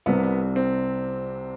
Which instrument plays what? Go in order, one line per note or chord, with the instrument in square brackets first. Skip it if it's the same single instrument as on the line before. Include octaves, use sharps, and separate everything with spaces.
[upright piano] C2 C3 G3 C4 [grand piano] B3
[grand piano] B3
C4